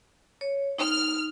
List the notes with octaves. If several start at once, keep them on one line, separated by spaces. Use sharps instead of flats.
C#5
D#4 F6